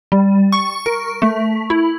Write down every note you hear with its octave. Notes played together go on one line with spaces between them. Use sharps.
G3
C#6
A#4
A3
E4